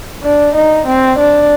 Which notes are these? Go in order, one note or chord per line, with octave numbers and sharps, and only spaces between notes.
D4
D#4
C4
D4